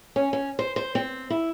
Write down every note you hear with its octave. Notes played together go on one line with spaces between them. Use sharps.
C#4
C#4
C5
C5
C4
E4